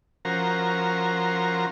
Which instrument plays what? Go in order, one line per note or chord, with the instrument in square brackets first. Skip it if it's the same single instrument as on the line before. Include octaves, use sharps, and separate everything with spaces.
[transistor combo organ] F3 C#4 F#4 A#4 C5 A#5